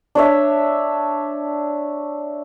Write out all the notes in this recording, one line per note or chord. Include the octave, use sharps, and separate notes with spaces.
D4 C#5 E5